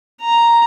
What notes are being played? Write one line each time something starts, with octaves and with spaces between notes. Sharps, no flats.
A#5